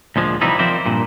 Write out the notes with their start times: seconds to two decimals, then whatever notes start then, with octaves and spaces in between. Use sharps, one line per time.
0.16 D2 A#2 F3 G#3
0.41 C3 E3 F3 G3 D#4 E4
0.59 F3 C4 A#4 C5 D5 E5
0.86 G2 A#2